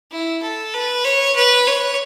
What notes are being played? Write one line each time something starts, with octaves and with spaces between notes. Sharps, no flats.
E4
A4
B4
C#5
B4
C#5